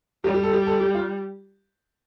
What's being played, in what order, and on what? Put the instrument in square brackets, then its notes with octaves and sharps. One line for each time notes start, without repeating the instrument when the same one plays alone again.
[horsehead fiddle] G3 [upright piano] G4
[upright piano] G4
A4
G4
A4
G4
F4